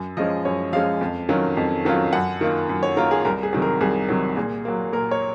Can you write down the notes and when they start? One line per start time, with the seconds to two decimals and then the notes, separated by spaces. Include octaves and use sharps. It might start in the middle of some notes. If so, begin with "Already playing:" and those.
Already playing: F#2
0.17 F3 G#3 C#4 D#5
0.45 F#2 C#5
0.73 F3 G#3 C#4 F5
1.01 F2
1.29 D#3 F#3 C#4 F4
1.57 F2
1.85 D#3 F#3 C#4 F4
2.13 F#2 F#5
2.41 D#3 A#3 F4
2.69 F#2
2.83 C#5
2.97 D#3 A#3 F4 A#4
3.11 G#4
3.25 C2 A#4
3.43 G#4
3.53 C3 D#3 F#3
3.62 A#4
3.81 C2 G#4
4.09 C3 D#3 F#3
4.37 A#2 G#4
4.65 F#3 A#3
4.93 A#2 A#4
5.11 C#5